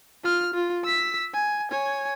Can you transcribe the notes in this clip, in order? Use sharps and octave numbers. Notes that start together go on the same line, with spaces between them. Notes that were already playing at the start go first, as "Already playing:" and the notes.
F4 F6
F4
E6 B6
G#5
C#5 G#5